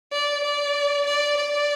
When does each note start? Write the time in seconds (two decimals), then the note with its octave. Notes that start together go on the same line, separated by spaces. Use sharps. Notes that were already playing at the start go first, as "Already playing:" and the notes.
0.12 D5
0.43 D5
1.06 D5
1.37 D5